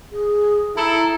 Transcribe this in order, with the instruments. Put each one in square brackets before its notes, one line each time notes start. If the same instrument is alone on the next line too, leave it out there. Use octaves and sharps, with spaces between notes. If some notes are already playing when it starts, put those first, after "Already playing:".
[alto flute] G#4
[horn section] E4 A4 [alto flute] A#5